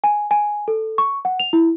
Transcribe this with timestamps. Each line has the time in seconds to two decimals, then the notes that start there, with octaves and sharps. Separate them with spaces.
0.04 G#5
0.31 G#5
0.68 A4
0.98 C#6
1.25 F#5
1.40 F7
1.53 E4